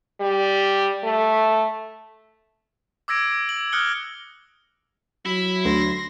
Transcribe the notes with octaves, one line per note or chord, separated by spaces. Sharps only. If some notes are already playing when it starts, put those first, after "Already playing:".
G3
A3
D6 E6 G#6 A#6 D7
F#7
D#6 F6 F#6 C#7 G7
F#3 E4 B5
D2 C6 A#6